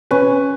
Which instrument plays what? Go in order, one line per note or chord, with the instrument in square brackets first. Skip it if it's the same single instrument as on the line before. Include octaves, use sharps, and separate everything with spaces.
[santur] C#4 [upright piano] B4